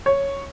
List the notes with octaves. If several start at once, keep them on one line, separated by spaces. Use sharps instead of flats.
C#5